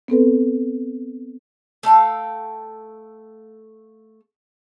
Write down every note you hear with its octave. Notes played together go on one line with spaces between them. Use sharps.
B3 C4 A4 B4
A3 A4 F5 G5